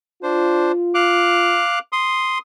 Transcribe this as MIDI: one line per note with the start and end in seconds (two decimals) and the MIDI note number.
0.23 0.72 62
0.23 1.63 65
0.23 0.72 72
0.94 1.79 77
0.94 1.79 86
0.94 1.79 90
1.92 2.38 84
1.92 2.38 87